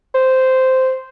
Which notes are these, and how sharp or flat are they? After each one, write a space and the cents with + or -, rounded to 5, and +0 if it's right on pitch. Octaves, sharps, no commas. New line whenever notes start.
C5 -10